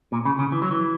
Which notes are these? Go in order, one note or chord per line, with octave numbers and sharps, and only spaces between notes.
A#2
C#3
C#3
E3
F#3
E3